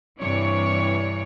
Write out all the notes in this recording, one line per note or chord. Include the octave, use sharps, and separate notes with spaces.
G2 C3 E3 C#5 D5